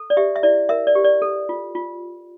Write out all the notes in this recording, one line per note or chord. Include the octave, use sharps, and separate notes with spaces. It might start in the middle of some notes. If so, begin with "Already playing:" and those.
Already playing: A4
D5
G4 E5
E5
E4 D5
A#4 E5
D5
G4
D5
A4
F4
F4